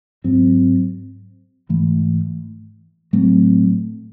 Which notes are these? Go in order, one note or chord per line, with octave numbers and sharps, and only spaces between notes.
G#2 F#3 C4
G#2 E3 A3
A2 F#3 A3 C4